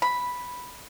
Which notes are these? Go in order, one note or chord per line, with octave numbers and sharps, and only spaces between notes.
B5